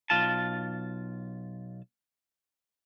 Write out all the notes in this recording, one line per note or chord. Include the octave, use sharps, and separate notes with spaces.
B1 F4 A5